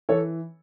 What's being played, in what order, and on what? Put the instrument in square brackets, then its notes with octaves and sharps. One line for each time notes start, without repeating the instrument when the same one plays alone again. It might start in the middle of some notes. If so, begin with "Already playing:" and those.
[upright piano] E3 A4 C#5